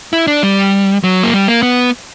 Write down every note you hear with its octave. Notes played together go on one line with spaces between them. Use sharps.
E4
D4
G3
F#3
A#3
G3
A#3
B3